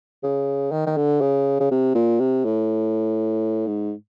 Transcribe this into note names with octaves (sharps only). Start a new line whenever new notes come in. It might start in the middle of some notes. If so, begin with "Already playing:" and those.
C#3
D#3
D#3
D3
C#3
C#3
C3
A#2
C3
A2
G#2